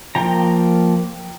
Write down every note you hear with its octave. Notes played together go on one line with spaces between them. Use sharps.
F3 A#3 G5 A#5